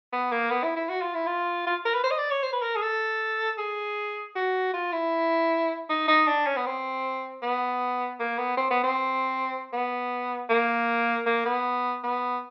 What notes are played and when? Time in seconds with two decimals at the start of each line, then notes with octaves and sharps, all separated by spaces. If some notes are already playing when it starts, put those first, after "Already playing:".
0.12 B3
0.31 A#3
0.50 B3
0.64 E4
0.76 E4
0.89 F#4
1.02 F4
1.14 E4
1.27 F4
1.67 F4
1.85 A#4
1.94 B4
2.04 C5
2.11 D#5
2.18 D5
2.31 C#5
2.43 C5
2.53 B4
2.62 A#4
2.76 G#4
2.82 A4
3.58 G#4
4.35 F#4
4.74 F4
4.92 E4
5.89 D#4
6.08 D#4
6.27 D4
6.46 C#4
6.57 B3
6.66 C4
7.43 B3
8.20 A#3
8.38 B3
8.57 C4
8.70 B3
8.84 C4
9.73 B3
10.49 A#3
11.26 A#3
11.45 B3
12.03 B3